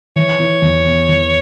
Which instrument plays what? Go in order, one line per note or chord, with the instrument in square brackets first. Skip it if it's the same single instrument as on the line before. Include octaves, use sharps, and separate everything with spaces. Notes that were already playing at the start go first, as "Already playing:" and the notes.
[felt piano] E3 [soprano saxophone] C#5
[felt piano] E4
E2
B3
E3